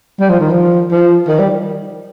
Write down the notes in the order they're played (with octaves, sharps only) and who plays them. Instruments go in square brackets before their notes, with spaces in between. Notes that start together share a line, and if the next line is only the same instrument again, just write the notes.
[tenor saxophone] G3
F3
D#3
F3
F3
D#3
G3